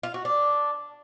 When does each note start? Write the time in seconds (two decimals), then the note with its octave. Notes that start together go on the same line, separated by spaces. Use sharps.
0.03 F4
0.14 F#4
0.25 D4